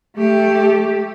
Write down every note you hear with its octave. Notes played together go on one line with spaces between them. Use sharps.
A3 G4